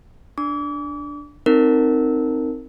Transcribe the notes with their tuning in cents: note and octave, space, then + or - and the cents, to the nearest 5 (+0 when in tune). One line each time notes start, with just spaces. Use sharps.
D4 +0 D6 -40
C4 +0 D#4 +0 A#4 -15